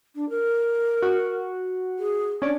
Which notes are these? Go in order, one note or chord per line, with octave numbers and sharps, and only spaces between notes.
D4
A#4
F#4
G#4
C#4 D4 D5